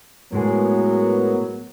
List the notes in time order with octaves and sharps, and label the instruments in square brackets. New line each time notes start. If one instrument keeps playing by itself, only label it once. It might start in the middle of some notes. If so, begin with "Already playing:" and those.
[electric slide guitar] A2 G#3 G#4 [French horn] F#3 [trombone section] B3 A#4